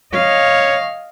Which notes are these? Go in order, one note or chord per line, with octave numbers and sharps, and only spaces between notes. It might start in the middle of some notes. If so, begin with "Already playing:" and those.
C#5 D#5 F5